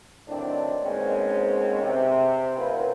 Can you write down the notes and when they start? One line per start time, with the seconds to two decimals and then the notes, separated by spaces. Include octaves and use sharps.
0.28 A2 D#3 F#3 C4 D4
0.83 G#2 B2 G#3 A#3 C4 C#4
1.83 C3
2.56 F#2 A#3 D#4 F4 B4